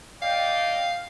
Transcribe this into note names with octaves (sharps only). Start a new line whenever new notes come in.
D5 D#5 F5 G5